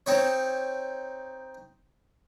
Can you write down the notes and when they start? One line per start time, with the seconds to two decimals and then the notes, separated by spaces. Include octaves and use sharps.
0.06 C4 D#4 C#5